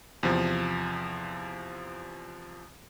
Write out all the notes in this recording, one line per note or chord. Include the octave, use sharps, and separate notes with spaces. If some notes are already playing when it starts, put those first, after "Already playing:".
E2 C3 F3